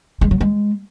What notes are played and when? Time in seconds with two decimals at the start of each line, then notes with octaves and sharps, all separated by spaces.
0.21 G#3
0.31 F#3
0.41 G#3